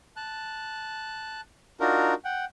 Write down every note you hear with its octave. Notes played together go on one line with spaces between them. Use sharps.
A5 F#6
D4 D#4 F4 F#4 A#4
F#5 G5